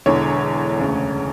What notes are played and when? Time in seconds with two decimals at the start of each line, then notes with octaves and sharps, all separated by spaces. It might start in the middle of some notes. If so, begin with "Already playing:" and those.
0.06 E1 E2 D3 C#5
0.79 E1 D2 C#3